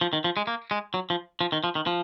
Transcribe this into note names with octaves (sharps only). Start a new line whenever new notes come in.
F3
D#3
F3
G#3
A#3
G#3
F#3
F3
F3
D#3
F3
D#3
F3